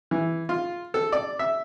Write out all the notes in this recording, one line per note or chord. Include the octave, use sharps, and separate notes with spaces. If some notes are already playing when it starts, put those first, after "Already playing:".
E3
F4
A4
D5
E5